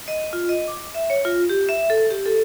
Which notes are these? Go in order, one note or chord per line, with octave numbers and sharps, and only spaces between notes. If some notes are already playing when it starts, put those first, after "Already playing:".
D#5
F4
D#5
D6
E5
C#5
F4
G4
E5
A4
G4
A4